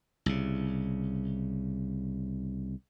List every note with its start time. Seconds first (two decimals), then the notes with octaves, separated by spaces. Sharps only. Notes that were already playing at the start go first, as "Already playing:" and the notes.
0.26 C2 C#3